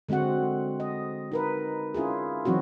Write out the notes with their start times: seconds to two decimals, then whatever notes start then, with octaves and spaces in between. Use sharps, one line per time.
0.09 D3 G#3 C4 F#4 F#5
0.80 D#5
1.32 D#4 A#4 B4
1.94 C#4 E4 F4 G#4
2.45 E3 F#3 C4 D#4 F#4